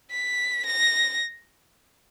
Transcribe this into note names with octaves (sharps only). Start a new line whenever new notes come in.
B6
A#6